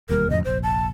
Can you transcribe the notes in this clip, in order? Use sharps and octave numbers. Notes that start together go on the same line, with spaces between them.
E1 D#2 G3 A#4
F2 A2 C#3 D#5
F1 A#1 C5
A5